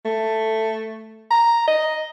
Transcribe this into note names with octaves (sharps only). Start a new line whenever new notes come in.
A3
A#5
D#5